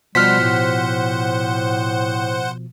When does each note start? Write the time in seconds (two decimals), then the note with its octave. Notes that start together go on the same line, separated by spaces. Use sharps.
0.15 B2 F3 G3 C5 F#5 F6 B6
0.40 A2